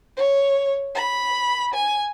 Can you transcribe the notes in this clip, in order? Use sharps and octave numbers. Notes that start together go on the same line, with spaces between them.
C#5
B5
G#5